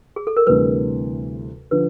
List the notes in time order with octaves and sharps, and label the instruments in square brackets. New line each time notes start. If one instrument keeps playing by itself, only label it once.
[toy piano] G#4
A4
A#4
[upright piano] D2 C3 E3 G3 [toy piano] B4
[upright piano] D3 F3 [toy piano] B4